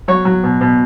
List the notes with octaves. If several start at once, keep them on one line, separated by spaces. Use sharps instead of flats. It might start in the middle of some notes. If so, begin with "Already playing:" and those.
F#3 C#5
F#3
B2
B2